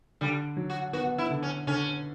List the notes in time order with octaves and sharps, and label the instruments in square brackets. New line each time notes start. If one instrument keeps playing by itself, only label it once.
[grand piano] D3 [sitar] G3
[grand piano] F#3
[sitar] F#4
[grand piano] B3 [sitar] F#4
[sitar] E4
[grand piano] D3
[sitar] C#4
[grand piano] D3 [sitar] C#4